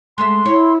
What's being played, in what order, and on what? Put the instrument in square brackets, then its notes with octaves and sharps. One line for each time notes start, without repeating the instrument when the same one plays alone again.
[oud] G#3 A3 E5 [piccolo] C6
[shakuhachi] E4 [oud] C#5